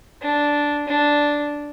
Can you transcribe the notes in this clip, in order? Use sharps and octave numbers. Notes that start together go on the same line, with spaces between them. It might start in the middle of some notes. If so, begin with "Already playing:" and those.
D4
D4